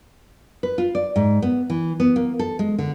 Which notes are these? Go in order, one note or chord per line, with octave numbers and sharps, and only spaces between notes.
B4
F4
D5
G#2
B3
E3
B3
A#3
A4
G#3
D3